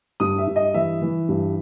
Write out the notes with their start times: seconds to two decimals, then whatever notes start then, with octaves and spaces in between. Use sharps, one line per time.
0.20 G2 D#6
0.38 E5
0.47 G2
0.56 D#5
0.74 E3 E5
1.01 E3
1.29 G2